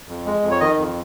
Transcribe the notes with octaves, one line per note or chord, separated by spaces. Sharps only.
F2
G#3
F2
C#5
D#3 D#5
F2